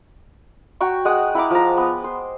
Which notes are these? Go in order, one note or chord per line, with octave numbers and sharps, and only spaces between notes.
F#4 G5 A#5 C#6
G#3 F#5 G5 D#6
E4 F#5 A#5 D6
F3 A#5
B3
C5